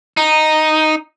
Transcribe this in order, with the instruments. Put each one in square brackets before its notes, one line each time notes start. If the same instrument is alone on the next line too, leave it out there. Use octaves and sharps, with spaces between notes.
[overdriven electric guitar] D#4